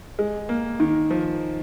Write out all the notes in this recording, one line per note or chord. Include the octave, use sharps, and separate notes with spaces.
G#3
A#3
D#3
F3